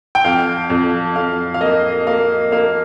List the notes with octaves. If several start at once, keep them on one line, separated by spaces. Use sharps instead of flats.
G5
F2 F5
F2
F2 F5
F5
A#3 D#5
A#3 F5
A#3 F5